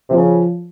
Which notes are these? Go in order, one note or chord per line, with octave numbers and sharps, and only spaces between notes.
C3 F3
C#3